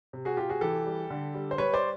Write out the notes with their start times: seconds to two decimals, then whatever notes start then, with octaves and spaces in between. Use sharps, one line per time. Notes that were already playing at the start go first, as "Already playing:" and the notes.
0.13 C3
0.25 F#4 G#4
0.37 C3 F4 G4
0.49 F#4 G#4
0.61 E3 G4 A4
0.86 G3
1.10 D3
1.34 G3
1.51 C5
1.58 G3 B4 C#5
1.74 C5 D5